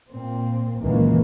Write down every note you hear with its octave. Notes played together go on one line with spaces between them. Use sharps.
A#2 C4
C#2 F#2 A#2 D#3 E3 A#3